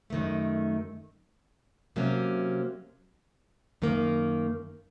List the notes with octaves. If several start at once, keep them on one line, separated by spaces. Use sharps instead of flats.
F#2 D#3 A3
C3 F#3 A#3 C#4
F#2 D#3 A#3